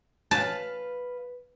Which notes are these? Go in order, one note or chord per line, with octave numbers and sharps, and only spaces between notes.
B4 F5 A5